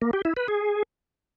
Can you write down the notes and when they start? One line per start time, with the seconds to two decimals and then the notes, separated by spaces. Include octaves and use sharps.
0.02 A#3
0.13 G4
0.25 E4
0.37 B4
0.48 G#4